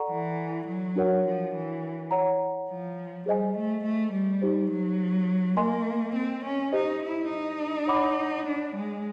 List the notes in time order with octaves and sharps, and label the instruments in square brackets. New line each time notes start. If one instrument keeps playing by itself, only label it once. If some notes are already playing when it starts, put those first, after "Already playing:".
Already playing: [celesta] A4 D5 F#5 A#5 C#6
[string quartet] E3
F#3
[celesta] D4 F#4 A#4 C#5 F#5
[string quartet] F3
E3
[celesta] C#5 F#5 A#5
[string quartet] F3
[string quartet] G3 [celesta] G#4 C5 D#5 G#5
[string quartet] A3
A3
G3
[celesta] D#4 G4 C5
[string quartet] F#3
[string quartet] A#3 [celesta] A#4 D#5 G#5 C6
[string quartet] C4
C#4
[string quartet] D#4 [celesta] G4 C5 D#5
[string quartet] E4
D#4
[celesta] C#5 F#5 B5 D6
[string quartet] D4
G#3